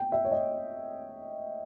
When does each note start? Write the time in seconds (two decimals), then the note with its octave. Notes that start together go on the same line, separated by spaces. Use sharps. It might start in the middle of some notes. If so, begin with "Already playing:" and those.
Already playing: G5
0.12 E5
0.25 C#5
0.31 D#5